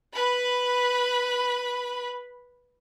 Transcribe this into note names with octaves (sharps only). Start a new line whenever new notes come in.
B4 B5